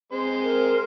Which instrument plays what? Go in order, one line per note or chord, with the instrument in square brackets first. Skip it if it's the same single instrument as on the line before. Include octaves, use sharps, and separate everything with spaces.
[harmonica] G#3 C5 [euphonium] C4
[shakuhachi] A#4